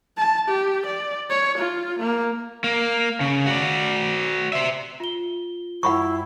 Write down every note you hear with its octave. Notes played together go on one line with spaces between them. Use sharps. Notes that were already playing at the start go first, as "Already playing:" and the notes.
A5
G4
D5
C#5
F4
A#3
A#3
C#3
F#4 D5
C5 E5
F4 G7
F#2 G3 E4 F#5 B5 C#6